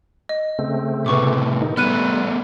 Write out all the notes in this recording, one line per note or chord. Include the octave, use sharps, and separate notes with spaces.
D#5
C#3 A3 C4
A2 C3 B4 C#6 D6
C3 D#3 D#4
G3 A3 B3 F6 F#6 D#7